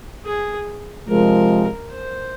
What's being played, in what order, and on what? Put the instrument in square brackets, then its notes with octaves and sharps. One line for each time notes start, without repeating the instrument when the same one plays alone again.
[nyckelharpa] G#4
[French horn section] C3 F3 G#3 [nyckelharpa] A#4
[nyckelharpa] C5